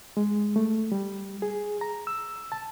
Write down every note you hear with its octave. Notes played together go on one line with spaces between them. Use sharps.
G#3
A3
G3
G#4
A#5
E6
A5